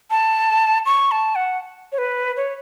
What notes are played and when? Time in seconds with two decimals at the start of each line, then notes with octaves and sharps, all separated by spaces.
0.11 A5
0.86 C#6
1.11 A5
1.35 F#5
1.92 C#5
1.98 B4
2.37 C#5